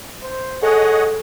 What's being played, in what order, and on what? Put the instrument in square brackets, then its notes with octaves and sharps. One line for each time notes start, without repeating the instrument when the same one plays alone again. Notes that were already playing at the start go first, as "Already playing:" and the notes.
[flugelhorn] C5
[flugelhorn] G#4 [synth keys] A4 [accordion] C#5 D#5 F#5